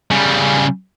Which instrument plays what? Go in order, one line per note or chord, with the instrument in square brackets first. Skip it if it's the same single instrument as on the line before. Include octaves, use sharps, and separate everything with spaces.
[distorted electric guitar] C#3 G3